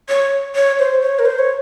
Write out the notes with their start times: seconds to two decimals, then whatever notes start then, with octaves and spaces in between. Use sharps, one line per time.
0.09 C#5
0.56 C#5
0.79 C5
1.01 C#5
1.19 A#4
1.25 C5
1.39 C#5